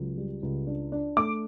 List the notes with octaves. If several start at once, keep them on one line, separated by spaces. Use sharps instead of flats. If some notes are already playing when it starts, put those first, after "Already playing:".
Already playing: C#2 F#3
G3
C#2
D4
D4
A3 D6